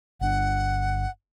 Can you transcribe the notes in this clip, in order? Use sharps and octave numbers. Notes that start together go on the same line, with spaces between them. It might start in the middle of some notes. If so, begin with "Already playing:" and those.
G1 D4 F#5